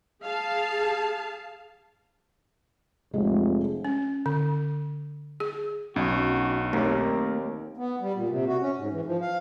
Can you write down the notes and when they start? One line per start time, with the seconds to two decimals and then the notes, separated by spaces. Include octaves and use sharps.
0.23 G#4 F5 A5
3.14 F1 G#3
3.85 C#4
4.26 D3
5.40 G#4
5.96 B1 C#4 D4 F#4 D#5
6.73 D#2 A3 C4 A#4 D5
7.77 B3
8.01 G3
8.15 A#2
8.29 C3
8.47 F#4
8.61 C#4
8.77 G#2
8.91 E3
9.06 F3
9.21 F5